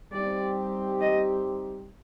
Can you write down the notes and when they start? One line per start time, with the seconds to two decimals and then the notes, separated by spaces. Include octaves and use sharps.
0.12 G3 C4 D#4 G4 D5
1.01 D#5